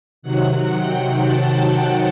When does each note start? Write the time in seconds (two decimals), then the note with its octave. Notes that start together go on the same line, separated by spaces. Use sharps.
0.22 C3 D#3 F#3 F#5
0.74 G5
1.25 A5
1.77 G5